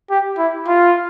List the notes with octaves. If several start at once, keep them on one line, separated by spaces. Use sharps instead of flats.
G4
E4
F4